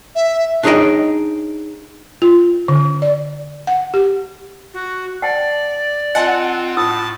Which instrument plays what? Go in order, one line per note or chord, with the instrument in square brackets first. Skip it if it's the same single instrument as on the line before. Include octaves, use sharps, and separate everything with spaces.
[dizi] E5
[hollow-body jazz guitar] D4 D#4 G#4 C#5 D#5 G5
[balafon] F4
D3
D5
F#5
G4
[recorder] F#4
[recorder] D5 [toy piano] F#5 G5 A5
[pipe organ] C4 F4 [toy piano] D#5 G#5 A5 [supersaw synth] F#5
[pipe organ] A2 [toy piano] F4 D#6 E6 [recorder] A5